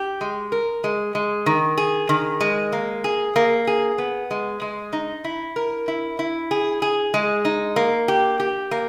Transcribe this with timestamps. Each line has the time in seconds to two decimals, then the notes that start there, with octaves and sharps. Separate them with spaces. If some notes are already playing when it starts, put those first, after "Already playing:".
Already playing: G4
0.21 G#3
0.52 A#4
0.84 G#3
1.15 G#3
1.46 D#3
1.77 G#4
2.09 D#3
2.41 G#3
2.73 A#3
3.04 G#4
3.36 A#3
3.67 G#4
3.98 B3
4.31 G#3
4.62 G#3
4.93 D#4
5.24 E4
5.56 A#4
5.88 E4
6.19 E4
6.51 G#4
6.82 G#4
7.14 G#3
7.45 D#4
7.76 A#3
8.08 G4
8.40 G4
8.71 A#3